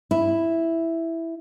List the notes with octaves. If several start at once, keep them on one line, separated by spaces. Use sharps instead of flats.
E4